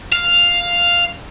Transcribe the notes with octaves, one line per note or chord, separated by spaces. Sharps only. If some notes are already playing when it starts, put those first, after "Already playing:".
F5